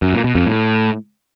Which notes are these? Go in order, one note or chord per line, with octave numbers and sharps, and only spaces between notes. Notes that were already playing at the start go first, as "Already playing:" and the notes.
F#2
A#2
B2
F2
A2